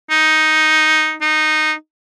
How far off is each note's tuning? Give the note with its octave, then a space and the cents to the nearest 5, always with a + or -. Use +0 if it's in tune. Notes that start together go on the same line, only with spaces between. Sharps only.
D#4 +5
D#4 -10